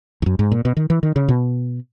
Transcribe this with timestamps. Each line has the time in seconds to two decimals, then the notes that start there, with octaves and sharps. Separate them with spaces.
0.22 E2
0.26 F#2
0.39 G#2
0.52 A#2
0.65 B2
0.77 D#3
0.90 E3
1.03 D#3
1.16 C#3
1.28 B2